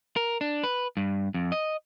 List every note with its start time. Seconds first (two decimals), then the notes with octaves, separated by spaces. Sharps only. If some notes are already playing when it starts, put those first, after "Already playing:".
0.16 A#4
0.41 D4
0.64 B4
0.97 G2
1.34 F2
1.52 D#5